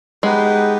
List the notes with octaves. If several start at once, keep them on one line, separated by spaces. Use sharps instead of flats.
G#3 B3 D#4 G4 B4